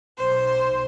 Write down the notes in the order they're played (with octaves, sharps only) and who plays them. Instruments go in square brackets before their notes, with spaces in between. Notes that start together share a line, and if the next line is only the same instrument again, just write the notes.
[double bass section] B1 [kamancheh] C5